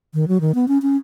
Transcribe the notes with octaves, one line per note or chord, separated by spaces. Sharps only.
D#3
F#3
D#3
B3
C#4
C#4